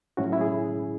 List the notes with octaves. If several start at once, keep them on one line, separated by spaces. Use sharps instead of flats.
A2 F#3 C#4 E4 F#4
E4 E5
G#4